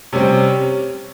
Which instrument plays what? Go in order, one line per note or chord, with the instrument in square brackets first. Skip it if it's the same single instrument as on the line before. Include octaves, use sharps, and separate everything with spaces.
[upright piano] C3 G3 C4 C#4